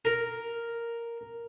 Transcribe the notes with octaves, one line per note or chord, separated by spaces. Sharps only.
A#4